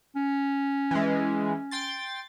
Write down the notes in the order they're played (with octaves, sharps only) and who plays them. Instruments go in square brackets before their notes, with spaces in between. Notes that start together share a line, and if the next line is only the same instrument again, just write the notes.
[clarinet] C#4
[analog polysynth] E3 G#3
G5 C6 A6